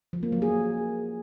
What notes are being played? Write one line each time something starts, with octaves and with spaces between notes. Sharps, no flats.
F3
A#3
F#3
G#4